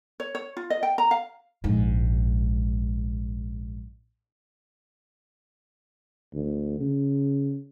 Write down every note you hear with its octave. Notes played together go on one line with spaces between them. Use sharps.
C#5
C#5
F4
D#5
G5
A#5
F5
A#1 G#2
D2
C#3